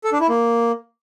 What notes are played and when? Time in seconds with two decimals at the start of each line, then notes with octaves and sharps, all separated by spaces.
0.04 A4
0.12 D4
0.21 E4
0.29 A#3